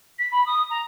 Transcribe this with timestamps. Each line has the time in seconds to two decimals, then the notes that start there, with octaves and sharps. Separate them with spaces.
0.18 B6
0.31 B5
0.46 D#6
0.69 A#5